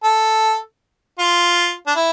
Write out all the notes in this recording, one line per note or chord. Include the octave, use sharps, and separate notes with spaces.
A4
F4
D4
E4